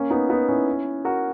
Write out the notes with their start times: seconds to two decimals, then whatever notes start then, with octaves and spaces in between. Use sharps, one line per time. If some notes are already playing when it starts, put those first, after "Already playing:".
Already playing: A#3 C#4
0.10 B3 D#4
0.29 B3 D#4
0.49 C#4 E4
1.05 F#4 A#4